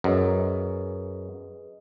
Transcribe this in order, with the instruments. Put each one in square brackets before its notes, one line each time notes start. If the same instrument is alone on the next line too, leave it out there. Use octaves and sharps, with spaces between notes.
[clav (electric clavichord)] F#2 [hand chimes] G#4 B4 D#5